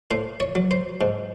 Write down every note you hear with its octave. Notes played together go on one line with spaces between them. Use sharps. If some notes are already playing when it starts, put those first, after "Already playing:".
A2 C5
C#5
F#3
C5
G#2